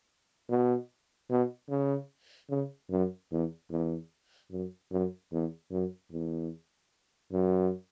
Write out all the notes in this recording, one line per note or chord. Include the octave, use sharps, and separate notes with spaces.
B2
B2
C#3
C#3
F#2
E2
E2
F#2
F#2
E2
F#2
E2
F#2